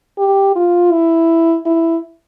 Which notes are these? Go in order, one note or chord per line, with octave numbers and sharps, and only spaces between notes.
G4
F4
E4
E4